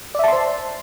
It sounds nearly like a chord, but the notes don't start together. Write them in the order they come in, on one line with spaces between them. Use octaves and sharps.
D5 E5 A5 C6 C5